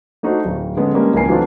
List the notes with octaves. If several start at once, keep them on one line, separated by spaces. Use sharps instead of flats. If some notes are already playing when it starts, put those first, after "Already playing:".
A3 D4 D#4 F#4 C5
D1
D3 G#3 B3 C#4
G3 G#3 A#3 C#4 D4
C#2 E3 C#4 A#4 G#5 C7
E3 F#3 A3 C4 D4 F4